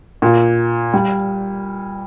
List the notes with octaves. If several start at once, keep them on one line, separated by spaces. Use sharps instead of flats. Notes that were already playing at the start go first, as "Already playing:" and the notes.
A#2
G3